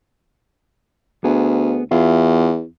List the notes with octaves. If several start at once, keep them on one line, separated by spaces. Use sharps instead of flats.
D2 B3 G#4
E2 F4 E5 F5